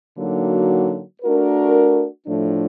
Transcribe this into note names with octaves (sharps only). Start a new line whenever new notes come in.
D3 F#3 A#3 D#4 F#4
A3 D4 F#4 A#4
A2 F3 A3 D4